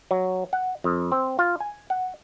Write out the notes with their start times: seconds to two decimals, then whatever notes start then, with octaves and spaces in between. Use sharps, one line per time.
0.11 F#3
0.53 F#5
0.84 F2
1.12 C4
1.39 F4
1.60 G#5
1.90 F#5